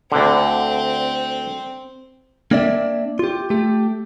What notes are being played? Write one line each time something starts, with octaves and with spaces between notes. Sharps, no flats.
D2 D3 C4
A#3 C4 D4 D5 E5
F4 G4
A3 G4